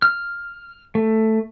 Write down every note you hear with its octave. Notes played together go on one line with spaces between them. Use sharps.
F6
A3